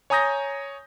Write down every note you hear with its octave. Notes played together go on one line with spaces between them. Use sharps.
C#5 G#5 A#5 D#6 G6 A#6